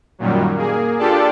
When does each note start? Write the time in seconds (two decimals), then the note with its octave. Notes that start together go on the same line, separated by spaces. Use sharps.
0.19 F#2 A#2 D#3 F#3 G3
0.56 A#3 G#4
0.98 D4 F4 G4 A4 D5 A5